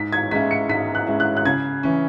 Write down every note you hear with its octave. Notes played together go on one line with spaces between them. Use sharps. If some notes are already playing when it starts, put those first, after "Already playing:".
Already playing: G#2 B6
G#6
G#3 C#4 E4 B6
C#7
G#2 B6
F#6
G#3 C#4 E4
F#6
F#6
C#3 G#6
E3 C#4